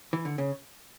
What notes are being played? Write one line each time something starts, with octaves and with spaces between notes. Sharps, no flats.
E3
D3
C#3